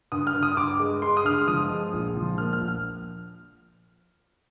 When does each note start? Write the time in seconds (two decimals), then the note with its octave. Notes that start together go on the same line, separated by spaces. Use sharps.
0.12 G2 D#6
0.27 F6
0.35 G2
0.43 D#6
0.57 G2 D6
0.79 G#3
1.02 G#3 C6
1.17 D#6
1.25 G2 F6
1.33 D#6
1.48 F3 D#6
1.70 G#3
1.93 A#1
2.16 F3
2.38 A#2 F6
2.53 F6
2.61 A#1
2.68 F6